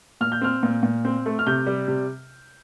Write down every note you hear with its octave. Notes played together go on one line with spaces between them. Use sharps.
A#2 F6
G6
C4 F6
A#2
A#2
C4
A3
F6
C3 G6
G3
C3